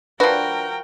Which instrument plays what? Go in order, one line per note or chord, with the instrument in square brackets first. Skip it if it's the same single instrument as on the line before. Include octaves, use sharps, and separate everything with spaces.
[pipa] F3 F#4 [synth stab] D4 B4 [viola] A#4 G5